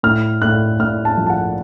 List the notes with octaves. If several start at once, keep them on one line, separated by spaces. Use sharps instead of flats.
A2 F6
A2 F#6
A2 F6
A5
F3
A5
F#5